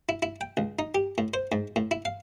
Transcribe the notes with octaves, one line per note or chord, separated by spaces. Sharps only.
E4
E4
G5
C#2
D#4
G4
A2
C5
G#2
A2
E4
F5